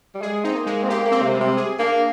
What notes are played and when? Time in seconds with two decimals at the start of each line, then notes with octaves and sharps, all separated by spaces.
0.15 G3
0.21 G#3 G#4
0.44 C4 D#4
0.56 A#3
0.66 G#3
0.83 C4
0.89 A#3 G4
1.05 A#3
1.12 C4
1.22 C3
1.34 G3
1.40 C3
1.57 G#4
1.79 A#3 D4